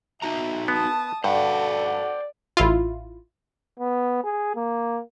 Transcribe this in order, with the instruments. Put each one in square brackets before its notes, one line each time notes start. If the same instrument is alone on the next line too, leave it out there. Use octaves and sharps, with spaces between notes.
[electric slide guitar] D#4 F#4 A#5 [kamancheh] E5
[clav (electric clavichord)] B3 [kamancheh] A5 D#6
[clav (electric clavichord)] G2 [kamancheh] F#4 A4 [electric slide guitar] C5 F#5 G5 [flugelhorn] D5
[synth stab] A1 E4 F4
[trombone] B3
G#4
A#3